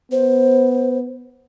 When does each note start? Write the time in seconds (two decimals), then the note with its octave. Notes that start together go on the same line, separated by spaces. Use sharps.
0.12 B3 C5